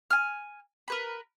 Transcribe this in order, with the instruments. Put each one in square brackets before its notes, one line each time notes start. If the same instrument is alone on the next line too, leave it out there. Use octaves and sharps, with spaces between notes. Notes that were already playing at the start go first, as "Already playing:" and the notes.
[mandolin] G#5 F6
A#4 B4 B5